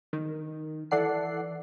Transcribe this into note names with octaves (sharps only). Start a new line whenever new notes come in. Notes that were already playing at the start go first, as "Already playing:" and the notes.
D#3
E3 A4 D5 F#5 C7